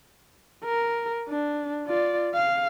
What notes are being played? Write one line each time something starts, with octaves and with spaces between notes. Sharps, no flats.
A#4
D4
F4 D5
F5